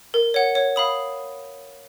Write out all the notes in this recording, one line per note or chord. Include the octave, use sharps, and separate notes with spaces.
A#4
C#5 F#5
C#5
F5 B5 D#6